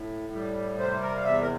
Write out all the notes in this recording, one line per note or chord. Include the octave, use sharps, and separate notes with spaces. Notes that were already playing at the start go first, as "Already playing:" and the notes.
Already playing: A2
G3
C3 C5
A#4
F5
E2 E5
A#4